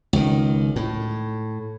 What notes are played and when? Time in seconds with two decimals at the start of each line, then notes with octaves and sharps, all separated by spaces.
0.13 C#2 D#3
0.76 A2